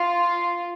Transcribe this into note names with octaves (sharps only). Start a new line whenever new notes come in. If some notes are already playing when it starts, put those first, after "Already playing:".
Already playing: F4